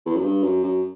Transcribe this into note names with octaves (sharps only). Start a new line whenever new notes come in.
E2
F#2
G2
F#2
F#2